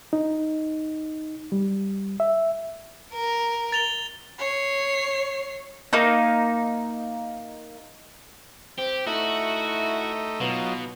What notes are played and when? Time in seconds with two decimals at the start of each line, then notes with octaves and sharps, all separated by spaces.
0.13 D#4
1.52 G3
2.20 E5
3.14 A#4
3.72 A6 F7 G7
4.38 C#5 C7
5.93 A#3 D#4
8.78 C4 G4
9.07 A3 D#4 E4 F#4
10.41 B2 F#3 B3 D#4 F4